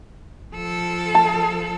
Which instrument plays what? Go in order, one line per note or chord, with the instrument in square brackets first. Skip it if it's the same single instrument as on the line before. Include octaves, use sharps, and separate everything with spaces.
[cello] F3 A4
[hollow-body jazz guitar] A5